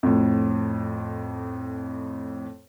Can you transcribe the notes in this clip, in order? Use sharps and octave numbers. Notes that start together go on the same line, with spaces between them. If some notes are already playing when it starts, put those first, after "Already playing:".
F2 A2